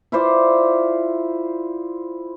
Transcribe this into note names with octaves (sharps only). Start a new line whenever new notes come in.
E4 F4 C5 D5